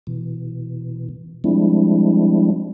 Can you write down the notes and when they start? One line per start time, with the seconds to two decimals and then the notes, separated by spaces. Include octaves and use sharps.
0.07 B2 E3
1.44 F3 G3 G#3 C4 D4 E4